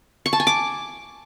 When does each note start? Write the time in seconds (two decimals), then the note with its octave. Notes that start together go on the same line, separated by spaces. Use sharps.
0.26 C#6
0.33 A5
0.40 G#5
0.47 D6